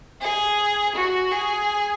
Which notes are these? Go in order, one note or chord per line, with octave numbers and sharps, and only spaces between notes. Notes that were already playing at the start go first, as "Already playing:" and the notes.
G#4
F#4
G#4